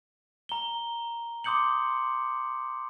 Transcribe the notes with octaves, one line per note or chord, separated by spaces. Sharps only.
A#5 G7
C6 D6 D#6 G6 C#7 F#7